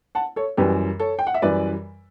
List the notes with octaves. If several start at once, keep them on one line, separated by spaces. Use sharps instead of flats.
F#5 A5
A4 C#5
F#2 E3 G3 G4 B4
A4 C#5
G5
F#5
E5
F#2 E3 G3 B4 D5